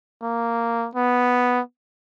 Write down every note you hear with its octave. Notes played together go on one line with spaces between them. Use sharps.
A#3
B3